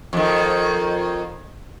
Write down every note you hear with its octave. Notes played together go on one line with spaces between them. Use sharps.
F2 D#3